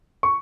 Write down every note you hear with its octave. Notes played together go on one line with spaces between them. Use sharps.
C#6